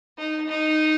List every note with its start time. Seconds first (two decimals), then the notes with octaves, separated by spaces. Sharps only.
0.18 D#4
0.48 D#4